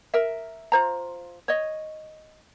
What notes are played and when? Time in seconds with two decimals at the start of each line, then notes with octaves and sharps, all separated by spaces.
0.14 A#4 E5
0.72 F4 C5 A#5
1.48 C#5 D#5